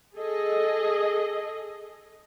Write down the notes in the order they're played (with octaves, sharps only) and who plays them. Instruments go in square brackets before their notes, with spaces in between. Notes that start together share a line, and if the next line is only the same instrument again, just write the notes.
[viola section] G#4 A4 D#5